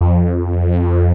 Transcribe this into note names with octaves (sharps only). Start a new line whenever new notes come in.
F2